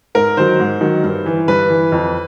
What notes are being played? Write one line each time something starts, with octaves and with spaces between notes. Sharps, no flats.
G#2 A#4
D#3 F#3 C5
G#2
D#3 F#3
G2
E3
G2 B4
E3
F2